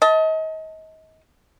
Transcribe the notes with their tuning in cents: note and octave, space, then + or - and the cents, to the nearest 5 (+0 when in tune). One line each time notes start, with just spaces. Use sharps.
D#5 +35 A5 +0